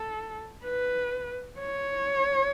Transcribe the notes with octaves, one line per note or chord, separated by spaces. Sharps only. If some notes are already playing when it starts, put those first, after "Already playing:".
Already playing: A4
B4
C#5